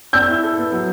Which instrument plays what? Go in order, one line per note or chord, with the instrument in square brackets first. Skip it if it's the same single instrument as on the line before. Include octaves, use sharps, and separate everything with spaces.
[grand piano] D5 [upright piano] E6 G6
[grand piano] E4
A4
B3
F#3